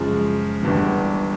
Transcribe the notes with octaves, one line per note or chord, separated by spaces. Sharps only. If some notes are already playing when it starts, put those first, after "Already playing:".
Already playing: F#2 C#3 F3 G#3
G1 G2 E3